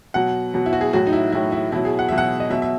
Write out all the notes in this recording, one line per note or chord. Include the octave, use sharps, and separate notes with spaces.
B2 F#3 F#5
B2 F#3
E4
F#4
G#4
A2 F#3 F#4
D#4
E4
A2 F#3 E4
E4
B2 F#3 E4
G#4
F#5
B2 F#3 E5
F#5
D#5
B2 F#3 E5
E5